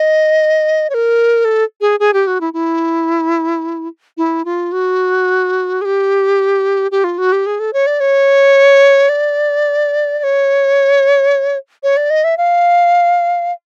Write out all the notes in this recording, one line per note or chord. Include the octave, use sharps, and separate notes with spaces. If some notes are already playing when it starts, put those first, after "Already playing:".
Already playing: D#5
C#5
A#4
A4
G#4
G#4
G4
F#4
E4
E4
E4
F4
F#4
G#4
G4
G4
F4
F#4
G4
G#4
A4
C#5
D5
C#5
D5
D5
C#5
C#5
D5
D#5
E5
F5